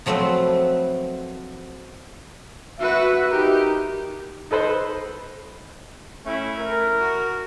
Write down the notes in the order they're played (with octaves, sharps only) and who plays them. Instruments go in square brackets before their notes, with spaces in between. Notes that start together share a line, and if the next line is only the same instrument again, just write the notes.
[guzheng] F3 F#3 A3 C4 B4
[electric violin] F#4 B4 [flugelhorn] E5
[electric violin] D#4 G4 [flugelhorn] A#4
[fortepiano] D#4 A4 B4 C5
[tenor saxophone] A3 [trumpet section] C#4 E4
[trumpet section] A#4
[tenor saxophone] F#4